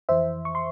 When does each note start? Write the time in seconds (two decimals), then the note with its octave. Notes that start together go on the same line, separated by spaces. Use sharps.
0.09 F2 E3 C5 E5
0.45 C#6
0.55 C6